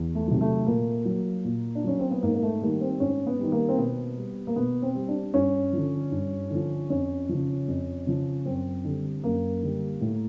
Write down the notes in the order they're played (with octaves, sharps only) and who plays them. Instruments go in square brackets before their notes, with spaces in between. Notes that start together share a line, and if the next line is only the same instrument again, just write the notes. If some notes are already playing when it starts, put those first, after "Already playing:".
Already playing: [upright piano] E2
A3
C3 D#3 F#3
A3
A#2 A#3
F#3
A#2
D4
F#3 C#4
C4
B3
G#2 A#3
A#3
A3
D#3 G3 A#3
C4
G#2 C#4
B3
D#3 G3
A#3
C4
B2 B3
G3
A#3
B2 B3
C4
G3
D4
G2 C#4
D3 F3
G2
D3 F3
F2 C#4
C#3 F3
F2
C#3 F3
F#2 C4
D3 G3
F#2 A#3
D3 G3
A2